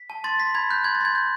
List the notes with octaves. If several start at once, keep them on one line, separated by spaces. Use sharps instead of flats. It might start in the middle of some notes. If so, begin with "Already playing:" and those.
Already playing: B6
A5
C6 A6
C6 B6
B5 G#6
F#6 G6
C6 G#6
A6
C6 G#6
G6